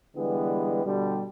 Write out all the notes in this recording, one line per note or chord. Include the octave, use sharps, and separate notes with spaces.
D3 E3 G3 G#3 B3
B2 D3 G3